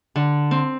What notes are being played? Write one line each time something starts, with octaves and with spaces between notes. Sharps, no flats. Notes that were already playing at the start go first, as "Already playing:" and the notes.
D3
C4